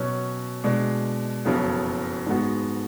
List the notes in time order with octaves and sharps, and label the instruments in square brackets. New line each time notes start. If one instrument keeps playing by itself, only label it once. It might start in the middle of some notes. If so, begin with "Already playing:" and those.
Already playing: [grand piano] B2 F#3 C#4
B2 G#3 D4
F#1 F2 C#3 F#3 B3
G#2 G#3 B3 F#4